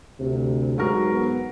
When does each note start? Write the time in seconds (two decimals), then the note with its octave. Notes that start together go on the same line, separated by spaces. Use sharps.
0.20 D2 C3
0.78 G#2 F#3 F#4 A#4
1.12 B3